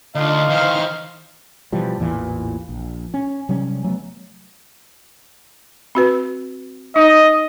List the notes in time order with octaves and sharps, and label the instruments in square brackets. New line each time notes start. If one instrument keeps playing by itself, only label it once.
[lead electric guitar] D2 [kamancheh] D4 F4 [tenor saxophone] D#4 [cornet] F5
[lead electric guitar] D#3 E3 [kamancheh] C5 F6
[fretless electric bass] B2 E3 F3 G3
A1 E2 A#2 E3
A#1
C#4
C3 F#3 G3 C#4
F#3 A3 B3
[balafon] C4 F#4 B4
[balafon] D#4 [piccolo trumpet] D#5